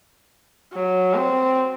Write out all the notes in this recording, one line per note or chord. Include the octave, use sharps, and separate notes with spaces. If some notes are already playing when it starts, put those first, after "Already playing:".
F#3
C4